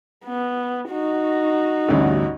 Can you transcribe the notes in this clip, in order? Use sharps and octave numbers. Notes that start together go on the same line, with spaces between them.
B3
D#4 F#4
A1 D2 G2